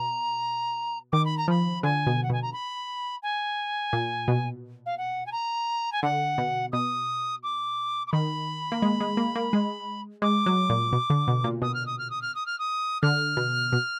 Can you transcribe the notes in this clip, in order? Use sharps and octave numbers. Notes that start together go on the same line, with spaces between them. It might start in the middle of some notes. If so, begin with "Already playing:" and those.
Already playing: B2 A#5
D#3 D6
B5
A#5
F3 B5
D3 G#5
B2
F#5
B2
G#5
A#5
B5
G#5
A#2
B2
F5
F#5
G#5
A#5
G#5
D3 F#5
B2
B2 D#6
D6
D6
D#3 B5
A#3
G#3
G#3
A#3
A#3
G#3
G#3 D6
F#3
A#2
B2
D3
B2
A#2
B2 D#6
F6
D#6
F6
D#6
F6
D#6
F6
D#6
D3 F6
B2
B2